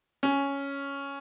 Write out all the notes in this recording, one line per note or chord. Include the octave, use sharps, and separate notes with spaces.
C#4